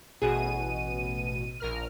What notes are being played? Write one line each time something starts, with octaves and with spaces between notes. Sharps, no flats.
A1 B2 F#4 G#4 D#7
A#1 A#4 F6